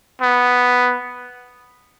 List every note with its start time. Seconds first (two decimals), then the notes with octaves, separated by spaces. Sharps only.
0.21 B3